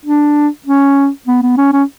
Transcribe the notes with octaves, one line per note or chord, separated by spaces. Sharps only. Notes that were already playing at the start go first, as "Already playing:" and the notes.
D4
C#4
B3
B3
C#4
C#4